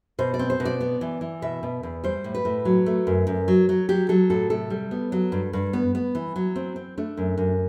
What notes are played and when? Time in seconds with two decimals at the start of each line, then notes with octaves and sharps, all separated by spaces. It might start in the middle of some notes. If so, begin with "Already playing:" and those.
0.19 B2 C5
0.34 D5
0.39 C4
0.50 C5
0.60 B2
0.65 D5
0.81 B3
1.01 E3
1.21 E3
1.42 B2 E5
1.63 B2
1.83 E2
2.04 G3 C5
2.24 A2
2.35 B4
2.45 A2
2.65 F#3
2.86 A3
3.07 F#2
3.27 F#2
3.48 F#3
3.69 F#3
3.89 F#3 G4
4.09 F#3 A4
4.30 A2 A4
4.50 C3 A4
4.70 G3
4.91 B3
5.12 F#3
5.32 G2
5.53 G2
5.73 B3
5.95 B3
6.15 E3
6.36 F#3
6.56 C4
6.76 C4
6.97 A3 D4
7.17 F#2
7.38 F#2